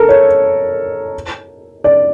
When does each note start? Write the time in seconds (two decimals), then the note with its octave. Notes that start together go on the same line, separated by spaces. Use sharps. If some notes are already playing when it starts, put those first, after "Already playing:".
Already playing: A4 A#4
0.09 C#5
1.84 D5